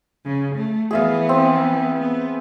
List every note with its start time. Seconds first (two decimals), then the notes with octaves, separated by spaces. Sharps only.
0.25 C#3
0.55 A3
0.91 E3 B3 G#4 E5 F5
1.29 C4
2.00 B3